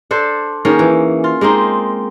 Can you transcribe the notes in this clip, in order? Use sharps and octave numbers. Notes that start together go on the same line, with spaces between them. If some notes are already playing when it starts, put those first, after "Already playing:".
D4 A4 C5
D#3 A#3 C#4 G#4
E3
F4
G#3 A#3 C4 D#4